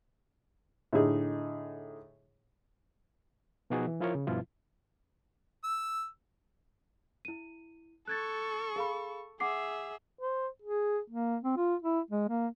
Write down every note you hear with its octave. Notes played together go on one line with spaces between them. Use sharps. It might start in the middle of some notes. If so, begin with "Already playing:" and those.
A2 D3 D#4 G#4
B2 F3 B3 D#4 F#4 G#4
E3
F3 E4 F4 A#4 C#5
C#3
G2 B2 F3 E4 F4
E6
E4 D#7
A4 C#6 F#6 G#6 A6
G#4 F5 B5
G#4 E5 F#5 D6 C7
C5
G#4
A#3
C4
F4
E4
G#3
A#3